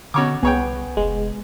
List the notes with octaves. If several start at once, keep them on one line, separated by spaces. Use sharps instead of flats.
B2 D3 C#5 D6
C2 B3 G#4 C#5 G5
F1 G#3